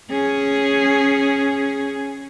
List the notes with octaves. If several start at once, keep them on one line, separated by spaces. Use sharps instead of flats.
C#4 G#4